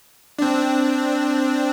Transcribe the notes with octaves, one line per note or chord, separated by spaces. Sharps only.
C4 D4